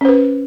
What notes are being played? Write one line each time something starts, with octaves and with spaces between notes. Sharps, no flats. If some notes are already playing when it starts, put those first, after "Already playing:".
C#4 B4 C5